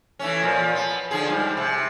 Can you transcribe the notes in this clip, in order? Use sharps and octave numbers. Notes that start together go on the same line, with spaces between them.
E3 A3 C#4
A#2 F3
B3
D3 F3 G#4
G#2 G3
C3